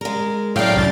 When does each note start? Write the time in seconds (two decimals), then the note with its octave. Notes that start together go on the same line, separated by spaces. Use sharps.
0.01 G#3 A#4
0.56 A2 F#3 D4 F5 G5
0.76 C2 F#2 A6